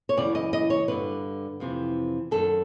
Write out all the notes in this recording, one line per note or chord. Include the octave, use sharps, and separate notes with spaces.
C#5
F#2 C#3 E3 D5
D#5
D#5
C#5
G2 D3 B4
F2 C3 E3
F#2 D#3 A4